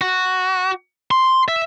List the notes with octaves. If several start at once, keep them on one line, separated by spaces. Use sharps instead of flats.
F#4
C6
E5